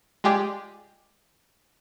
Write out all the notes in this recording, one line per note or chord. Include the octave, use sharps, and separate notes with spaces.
G#3 F4 G4 G#4 D5